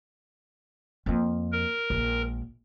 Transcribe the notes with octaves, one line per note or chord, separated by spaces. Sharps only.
F2 A#3
A#4
A#1 G#3